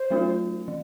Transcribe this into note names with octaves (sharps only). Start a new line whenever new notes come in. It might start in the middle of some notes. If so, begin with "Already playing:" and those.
Already playing: C5
F#3 A3 C#4 F4
E3